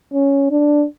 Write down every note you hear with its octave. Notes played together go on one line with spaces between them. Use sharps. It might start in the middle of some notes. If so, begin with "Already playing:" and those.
C#4
D4